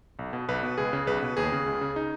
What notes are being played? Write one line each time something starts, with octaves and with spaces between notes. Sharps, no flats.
B1
B2
B1 B4
B2
C#2 G#4
C#3
B1 B4
B2
D#2 G#4
C#3
C#2
C#3
D#4